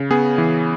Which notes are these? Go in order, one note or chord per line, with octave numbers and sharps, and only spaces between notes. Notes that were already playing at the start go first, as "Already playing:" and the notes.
Already playing: C#3
B3 G#4
E3